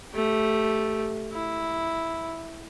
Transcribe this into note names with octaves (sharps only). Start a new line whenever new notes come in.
A3 G4
E4